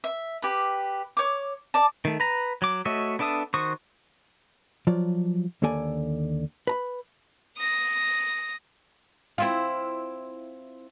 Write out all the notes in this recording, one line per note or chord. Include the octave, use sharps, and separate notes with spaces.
E5
G4 B4
C#5 D6
D5 A5
D#3 A3
B4 A#5
F#3 D6
A3 F#4 C#5 D#5 E5
B3 D4 A4 E5 D#6
D#3 F#4 C5 C#6 D#6
F3 F#3 F4 D5
D#2 D3 A#3 A4 D5 G#5
B4 A#5 B5
D#6 A#6
C4 E4 F4